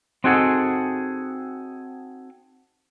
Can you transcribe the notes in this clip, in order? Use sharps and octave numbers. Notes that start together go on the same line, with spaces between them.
C4 D#4 F#4 G#4 A4 F#5